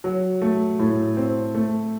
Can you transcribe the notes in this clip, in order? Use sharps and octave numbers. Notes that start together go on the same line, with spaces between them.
F#3
A3
A2
C4
A3